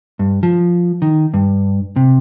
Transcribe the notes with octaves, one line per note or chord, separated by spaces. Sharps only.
G2
F3
D#3
G2
C3